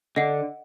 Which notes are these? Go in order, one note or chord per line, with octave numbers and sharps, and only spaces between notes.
D3 D#5 F#5